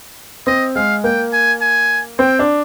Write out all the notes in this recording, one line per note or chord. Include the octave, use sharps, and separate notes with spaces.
C4 D#5
G#3 F5
A#3 G5
G#5
G#5
C4 G5
D4